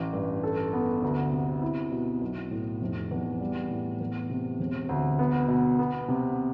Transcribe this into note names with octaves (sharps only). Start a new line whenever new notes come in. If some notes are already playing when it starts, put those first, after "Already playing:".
Already playing: A1
G2
A4
B3
D2
C3
E4
B2
B1
A2
F1
E2
G3
A2
E2
C3
E1
D2
B3
B2
B3
C3